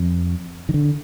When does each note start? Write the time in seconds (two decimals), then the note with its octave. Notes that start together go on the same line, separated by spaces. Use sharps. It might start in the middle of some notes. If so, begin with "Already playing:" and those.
Already playing: F2
0.69 D#3
0.74 D3